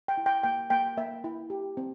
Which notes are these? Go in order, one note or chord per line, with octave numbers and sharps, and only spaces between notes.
G5
E4
G5
A#3 G5
A#3 G5
A#3 E5
E4
G4
C4